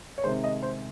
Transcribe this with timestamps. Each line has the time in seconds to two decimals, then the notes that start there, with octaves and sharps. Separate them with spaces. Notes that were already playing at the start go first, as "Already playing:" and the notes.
0.18 C#5
0.23 C3 D#3 G#3 C5
0.44 D#5
0.63 C5